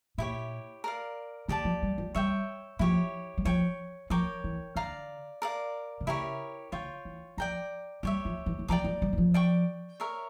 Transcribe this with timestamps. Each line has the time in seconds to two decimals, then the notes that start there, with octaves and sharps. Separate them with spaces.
0.18 A#2 E4 G4 C#5
0.84 A#4 D5 F5
1.48 D3 G4 D5 A5
1.65 F3
1.82 G3
1.98 F3
2.15 G3 C#5 E5 G5
2.79 F3 E4 G4 C#5
3.38 G3
3.45 F3 C#5 G5 C#6
4.10 F3 A#4 C#5 G5 D6
4.44 E3
4.76 D3 D5 F5 A#5
5.42 A#4 D5 F5
6.01 D3
6.07 C#3 E4 G4 A#4 C#5
6.72 D3 F4 C#5 G5
7.05 E3
7.37 F3 D5 G5 A#5
8.03 G3 G4 C#5 E5
8.25 F3
8.46 E3
8.59 E3
8.68 F3 D5 G5 A#5 D6
8.84 F3
9.02 G3
9.13 E3
9.18 F3
9.34 D5 G5 C#6
10.00 A#4 C#5 E5